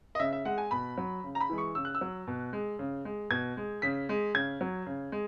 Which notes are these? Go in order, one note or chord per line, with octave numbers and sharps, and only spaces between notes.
D#5
C#3 E5
E5
G#3 F#5
G#5
B2 B5
F#3
C#3
A#5
B5
E3 G#3
C#6
C#3 E6
F#6
E6
F#3
B2
G#3
C#3
G#3
B2 G#6
G#3
C#3 B6
G#3
C#3 G#6
F#3
C#3
G#3